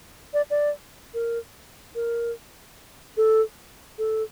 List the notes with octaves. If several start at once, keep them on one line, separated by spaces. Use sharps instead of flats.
D5
D5
A#4
A#4
A4
A4